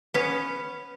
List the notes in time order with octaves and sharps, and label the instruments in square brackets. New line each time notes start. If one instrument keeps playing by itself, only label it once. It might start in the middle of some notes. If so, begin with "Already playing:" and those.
[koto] B3 C#4 [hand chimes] B4